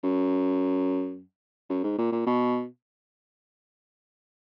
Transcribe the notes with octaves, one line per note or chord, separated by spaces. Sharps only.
F#2
F#2
G#2
A#2
A#2
B2